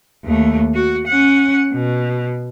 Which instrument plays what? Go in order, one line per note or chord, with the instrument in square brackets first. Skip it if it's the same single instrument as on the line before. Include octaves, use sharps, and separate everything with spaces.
[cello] D#2 A3
F#4
C#4 F#5
B2